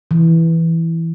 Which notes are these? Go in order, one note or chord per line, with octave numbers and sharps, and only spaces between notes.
E3